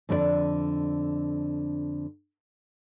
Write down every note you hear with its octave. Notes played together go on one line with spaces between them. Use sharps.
F2 D3 D4 F4 D5